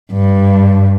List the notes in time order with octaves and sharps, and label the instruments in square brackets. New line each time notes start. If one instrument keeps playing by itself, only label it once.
[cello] G2